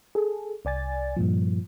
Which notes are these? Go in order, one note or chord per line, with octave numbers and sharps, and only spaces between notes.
G#4 A4
C2 D5 G#5 A6
G2 A#2 F3